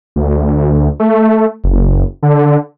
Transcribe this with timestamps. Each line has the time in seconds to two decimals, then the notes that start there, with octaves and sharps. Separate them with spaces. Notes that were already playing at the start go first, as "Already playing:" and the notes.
0.16 D2
1.00 A3
1.64 F#1
2.23 D3